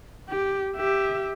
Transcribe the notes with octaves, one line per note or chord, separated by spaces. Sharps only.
G4
G4 E5